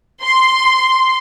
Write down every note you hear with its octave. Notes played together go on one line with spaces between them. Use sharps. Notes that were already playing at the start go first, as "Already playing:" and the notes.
C6